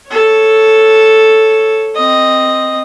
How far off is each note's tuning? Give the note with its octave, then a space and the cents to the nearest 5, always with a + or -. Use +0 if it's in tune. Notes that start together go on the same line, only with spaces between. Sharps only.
A4 +0 C#5 +0
C4 +0 D#5 +0